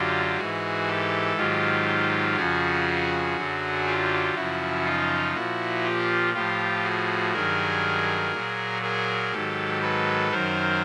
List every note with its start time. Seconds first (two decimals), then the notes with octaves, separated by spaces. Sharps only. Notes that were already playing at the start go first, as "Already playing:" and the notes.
Already playing: F#2 D3 F#3 F4 G4
0.37 G#2 E3 F#4 G#4
0.87 G4 A4
1.37 G#2 D#3 F#3 F4 G4
2.36 F2 C#3 F3 F#4 G#4
3.36 F#2 D3 F#3
3.86 F4 G4
4.35 F#2 C#3 F3 E4 F#4
4.85 D#4 F4
5.34 A#2 F3 E4 F#4
5.84 F4 G4
6.34 A2 F3 F4 G4
6.83 F#4 G#4
7.33 G2 D#3 F#3 G#4 A#4
8.33 A#2 F#3
8.82 G#4 A#4
9.32 G#2 D#3 F#3 G4 A4
9.82 A4 B4
10.31 F#2 D#3 F#3 A#4 C5